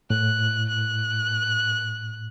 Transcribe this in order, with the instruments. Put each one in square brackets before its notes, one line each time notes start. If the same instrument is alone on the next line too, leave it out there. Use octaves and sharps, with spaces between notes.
[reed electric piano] A2 [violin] F#6
[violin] F#6